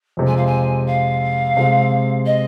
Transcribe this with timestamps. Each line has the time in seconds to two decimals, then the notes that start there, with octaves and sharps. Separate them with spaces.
0.17 F2 C3 G#3 C4
0.27 G#5
0.36 F5
0.46 G#5
0.87 F5
1.57 C3 G#3 C4
2.26 D#5